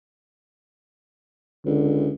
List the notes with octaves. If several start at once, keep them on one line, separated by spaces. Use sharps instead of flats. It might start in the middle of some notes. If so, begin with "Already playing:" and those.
C#2 D3